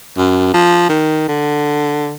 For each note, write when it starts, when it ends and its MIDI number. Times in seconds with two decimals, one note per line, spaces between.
0.18 0.51 42
0.54 0.85 53
0.89 1.28 51
1.28 2.16 50